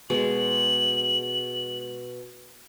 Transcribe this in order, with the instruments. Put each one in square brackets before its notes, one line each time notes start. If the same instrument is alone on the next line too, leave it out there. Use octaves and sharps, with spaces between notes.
[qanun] B2 G#3 [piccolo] F#7